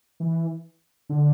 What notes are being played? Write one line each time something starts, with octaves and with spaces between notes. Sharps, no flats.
E3
D3